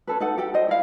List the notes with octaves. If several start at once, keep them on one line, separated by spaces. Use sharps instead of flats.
C#4 A4 B4
D#4 A4 F#5
G4 A4 G5
C5 D#5
E4 F5